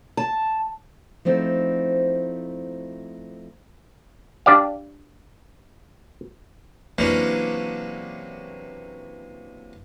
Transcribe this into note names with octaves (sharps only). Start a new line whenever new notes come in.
A5
F3 A3 C4 D#4 E4
D4 G4 D5 F5
C3 E3 F#3 A#3 C#4 D4